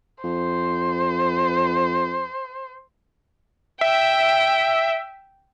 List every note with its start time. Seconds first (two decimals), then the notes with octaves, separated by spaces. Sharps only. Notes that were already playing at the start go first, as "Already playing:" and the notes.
0.24 F2 C5
3.81 E5 G5